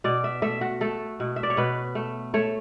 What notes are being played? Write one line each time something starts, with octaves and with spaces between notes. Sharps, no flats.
B2 D5
E5
A3 E5
F#4
A3 A4
B2
E5
D5
C#5
B2 B4
A3
A3 C#5